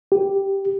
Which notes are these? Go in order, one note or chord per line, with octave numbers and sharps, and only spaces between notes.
G4